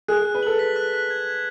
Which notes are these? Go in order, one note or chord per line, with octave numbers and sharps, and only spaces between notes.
G#4 F#6
F#6
B4
A4 F#7
B6
F#6
F#6
G#6
G#6